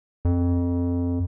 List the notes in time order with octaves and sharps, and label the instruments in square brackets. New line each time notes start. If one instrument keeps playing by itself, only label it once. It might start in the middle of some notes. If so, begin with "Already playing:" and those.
[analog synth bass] F2